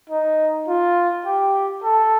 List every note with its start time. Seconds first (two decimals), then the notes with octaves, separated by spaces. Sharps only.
0.10 D#4
0.68 F4
1.26 G4
1.84 A4